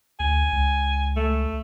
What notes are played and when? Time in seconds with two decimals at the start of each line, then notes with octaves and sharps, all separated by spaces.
0.20 D2 G#5
0.53 C#2
1.16 A3